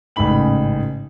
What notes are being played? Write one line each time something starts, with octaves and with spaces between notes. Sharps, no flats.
A1 G#2 C#3 D#4 B5 F#7